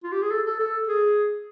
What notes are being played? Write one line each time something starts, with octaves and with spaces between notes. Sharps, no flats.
F4
G4
G#4
A4
A4
A4
G#4